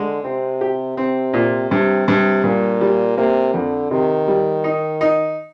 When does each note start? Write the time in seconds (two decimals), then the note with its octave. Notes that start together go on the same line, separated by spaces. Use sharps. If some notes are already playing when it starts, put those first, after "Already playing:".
Already playing: D3 G#3
0.24 C3 C4
0.61 G4
0.97 C3 C4
1.33 A#2
1.71 G2 C3
2.08 G2 C3
2.44 G2 A#2
2.81 G3
3.17 C3 A#3
3.54 F2 D3
3.91 C3 D#3
4.28 G3
4.64 D#4
5.01 D#4